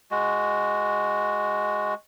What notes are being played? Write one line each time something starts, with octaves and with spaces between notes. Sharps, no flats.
G#3 F#4